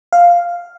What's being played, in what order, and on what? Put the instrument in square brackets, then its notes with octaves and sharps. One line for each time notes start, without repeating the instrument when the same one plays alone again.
[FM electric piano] F5